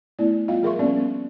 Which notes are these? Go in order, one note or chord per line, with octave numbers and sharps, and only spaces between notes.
A3 B3 E4 D5
G3 B3 F4 D#5 F5 G5
F3 G#4 A#4 E5 C6 C#6
G3 A#3 B3 C#4 D4 D5
B3